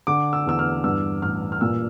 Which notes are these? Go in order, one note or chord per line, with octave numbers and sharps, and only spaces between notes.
D3 D6
E6
E2 E6
F6
G2 E6
A1 F6
F6
A#2 E6